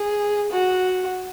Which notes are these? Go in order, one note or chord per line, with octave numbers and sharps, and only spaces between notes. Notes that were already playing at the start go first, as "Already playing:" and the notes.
Already playing: G#4
F#4